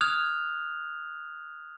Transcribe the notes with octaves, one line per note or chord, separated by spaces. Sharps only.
D#6 F6 F#6 G#6 F7